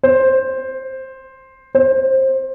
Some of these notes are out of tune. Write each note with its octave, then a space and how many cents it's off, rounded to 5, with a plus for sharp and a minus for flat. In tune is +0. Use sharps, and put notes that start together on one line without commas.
C5 +10
C5 +20